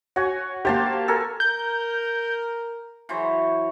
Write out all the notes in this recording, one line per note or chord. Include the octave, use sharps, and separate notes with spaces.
F#4 C#5 G#5
A#3 G4 C5 A5 C6
A4 A#4 G#5
A#4 G6
E3 F#3 C5 C#5